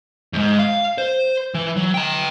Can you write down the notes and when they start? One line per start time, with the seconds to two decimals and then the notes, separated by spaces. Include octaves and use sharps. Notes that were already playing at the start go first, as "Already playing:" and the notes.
0.33 E2 G#2
0.59 F5
0.98 C5
1.54 E3
1.76 F#3
1.94 G5 A#5